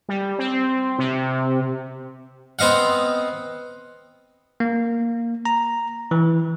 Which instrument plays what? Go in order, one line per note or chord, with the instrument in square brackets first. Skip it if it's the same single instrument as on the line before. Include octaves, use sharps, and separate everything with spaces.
[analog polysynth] G3
C4
C3
[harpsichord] B3 C4 D#5 F5 F#5
[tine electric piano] A#3
A#5
E3